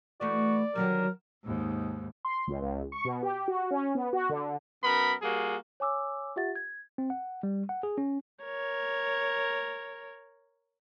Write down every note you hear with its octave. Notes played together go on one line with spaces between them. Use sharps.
E3 A3 F#4 D5
D3 D#3 F#3 G3 A#4
D#2 G#2
C6
C#2
C#2
C#6
B2
G4
F#4
C#4
B3
F#4
D3
F#2 B3 A#4 B5
G3 A#3 F#4 G#4
C#5 G#5 D6 E6
F4 G4 E5 F#5 A6
G#6
C4
F#5
G3
F#5
G#4
C#4
A#4 C#5